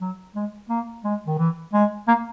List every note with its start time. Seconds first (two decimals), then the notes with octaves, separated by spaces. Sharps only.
0.01 F#3
0.35 G#3
0.70 A#3
1.04 G#3
1.27 D#3
1.38 E3
1.73 G#3
2.08 A#3